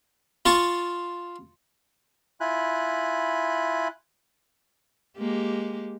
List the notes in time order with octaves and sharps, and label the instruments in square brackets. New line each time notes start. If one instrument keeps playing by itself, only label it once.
[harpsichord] F4 A5 C#6
[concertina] E4 F4 G#5 B5 F#6
[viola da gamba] G#3 A#3 G4